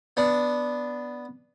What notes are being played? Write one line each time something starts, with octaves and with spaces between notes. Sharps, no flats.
B3 D4